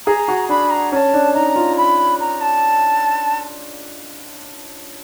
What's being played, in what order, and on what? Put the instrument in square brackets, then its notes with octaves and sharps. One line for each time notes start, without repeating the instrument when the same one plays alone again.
[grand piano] G#4 [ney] A#5
[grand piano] F#4
[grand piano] D4 [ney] B5
[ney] A#5
[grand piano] C#4 [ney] A5 A#5
[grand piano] D4
[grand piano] D#4 [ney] A#5
[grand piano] F4
[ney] B5
A#5
A5